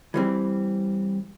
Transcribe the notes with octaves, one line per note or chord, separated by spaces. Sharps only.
E3 G3 C4